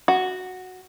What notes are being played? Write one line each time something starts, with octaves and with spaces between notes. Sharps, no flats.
F#4